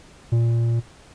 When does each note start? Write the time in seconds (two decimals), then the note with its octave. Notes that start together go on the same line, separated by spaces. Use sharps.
0.32 A#2